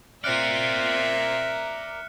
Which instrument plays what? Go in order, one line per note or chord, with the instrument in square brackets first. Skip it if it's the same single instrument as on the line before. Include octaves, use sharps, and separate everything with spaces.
[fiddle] C4 F4 [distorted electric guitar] A#4 D5 [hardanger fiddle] E5 [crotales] F6 F#6 C#7